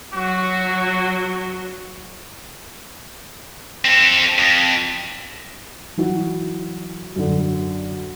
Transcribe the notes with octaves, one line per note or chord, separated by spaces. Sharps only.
F#3 F#4
C4 A4
F2
E3 F#3 E4 F#4
F#2 D3